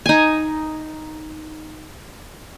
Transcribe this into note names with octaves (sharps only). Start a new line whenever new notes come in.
D#4 G#5